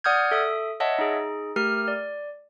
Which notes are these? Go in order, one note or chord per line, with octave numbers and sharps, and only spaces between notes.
D5 F#5 D#6 F6 G6 G#6
A4 E5 D#6
C#5 D#5 E5 F#5 A5
D#4 G#4
A3 G4 A#4 F6
D5